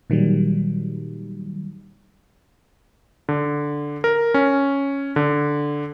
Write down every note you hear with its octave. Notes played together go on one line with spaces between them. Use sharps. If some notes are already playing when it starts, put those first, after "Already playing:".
A#2 D#3 F#3 G3
D3
A#4
C#4
D3